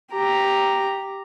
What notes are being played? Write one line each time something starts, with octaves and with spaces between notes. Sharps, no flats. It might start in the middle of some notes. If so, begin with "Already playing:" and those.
G4 A#5